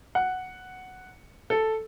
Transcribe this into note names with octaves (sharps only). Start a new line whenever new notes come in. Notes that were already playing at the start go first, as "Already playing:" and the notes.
F#5
A4